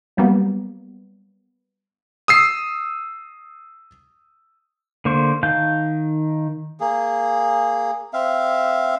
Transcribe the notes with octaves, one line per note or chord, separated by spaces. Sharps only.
F#3 G3 A#3 B3
D#6 E6 C7
D3 A#3 C5 C#6
D#3 F5 A5 G6
A#3 G#4
C4 E5 F5